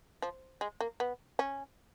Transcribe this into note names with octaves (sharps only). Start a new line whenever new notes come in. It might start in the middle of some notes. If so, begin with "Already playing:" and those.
F3
G#3
A#3
B3
C#4